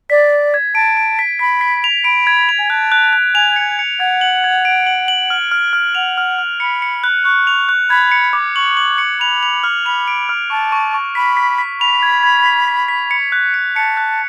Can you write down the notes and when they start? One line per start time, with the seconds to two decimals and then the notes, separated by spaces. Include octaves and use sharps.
0.10 D5 B6
0.32 B6
0.54 G#6
0.75 A5 D7
0.97 D7
1.19 B6
1.39 B5 B6
1.61 B6
1.84 F7
2.04 B5 D7
2.27 G#6
2.49 F7
2.59 G#5
2.70 A5 F#6
2.92 F#6
3.13 F#6
3.35 G#5 F7
3.56 C#7
3.79 C#7
4.00 F#5 G#6
4.21 F#7
4.44 G#6
4.65 D7
4.87 F#7
5.08 F#7
5.30 F6
5.51 F6
5.73 F6
5.95 F#5 F7
6.18 F6
6.39 F6
6.60 B5 C#7
6.82 C#7
7.04 F#6
7.25 C#6 F#6
7.47 F7
7.69 F#6
7.90 B5 G#6
8.11 C#7
8.33 D6
8.55 C#6 F#7
8.77 F#7
8.98 C#7
9.20 B5 F7
9.43 F7
9.64 F6
9.86 B5 F7
10.08 D7
10.29 F6
10.50 A5 C#6
10.72 C#6
10.94 C#6
11.15 B5 B6
11.37 B6
11.58 B6
11.80 B5 F7
12.03 G#6
12.23 G#6
12.46 B6
12.68 B6
12.88 B6
13.11 C#7
13.32 F#6
13.54 C#7
13.76 A5 C#7
13.97 F#6